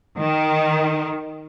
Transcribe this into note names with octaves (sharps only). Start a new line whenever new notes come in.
D#3